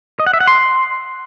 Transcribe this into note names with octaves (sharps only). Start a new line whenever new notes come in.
D#5
F#5
E5
F#5
C6